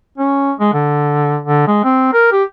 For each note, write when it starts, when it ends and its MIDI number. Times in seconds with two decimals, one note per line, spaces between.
0.18 0.53 61
0.60 0.71 56
0.74 1.38 50
1.43 1.66 50
1.67 1.80 56
1.84 2.11 60
2.14 2.32 70
2.32 2.44 67